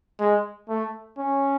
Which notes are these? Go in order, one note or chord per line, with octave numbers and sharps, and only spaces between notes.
G#3
A3
C#4